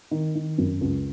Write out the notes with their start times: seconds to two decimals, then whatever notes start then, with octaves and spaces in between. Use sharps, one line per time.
0.11 D#3
0.35 D#3
0.58 F#2
0.81 C#2